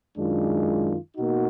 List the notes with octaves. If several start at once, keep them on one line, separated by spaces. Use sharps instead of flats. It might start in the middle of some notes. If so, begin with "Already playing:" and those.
F#2 D#3 G#3 D4 F4
B2 A#3 D#4 F#4